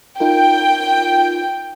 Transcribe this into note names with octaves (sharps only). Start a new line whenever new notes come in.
D#4 F4 A#4 G5